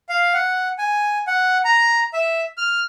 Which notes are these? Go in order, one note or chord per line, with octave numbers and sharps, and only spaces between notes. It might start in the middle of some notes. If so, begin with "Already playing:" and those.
F5
F#5
G#5
F#5
A#5
E5
F6